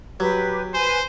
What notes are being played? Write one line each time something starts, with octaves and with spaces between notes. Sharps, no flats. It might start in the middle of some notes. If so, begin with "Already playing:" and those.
F#3 G4 B4
B4 C5 G#5